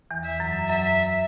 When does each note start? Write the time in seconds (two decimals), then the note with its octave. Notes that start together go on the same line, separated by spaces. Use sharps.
0.11 E2 E3
0.25 E5
0.40 F#2 F#3
0.69 F#2 F#3 E5